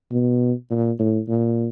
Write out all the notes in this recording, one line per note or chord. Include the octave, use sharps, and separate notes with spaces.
B2
A#2
A2
A#2